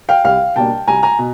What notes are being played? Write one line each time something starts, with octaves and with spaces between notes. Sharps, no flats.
F5 G5
C2 F5 G5
B2 G3 A#3 D4 G5 A5
C2 G#5 A#5
G#5 A#5
B2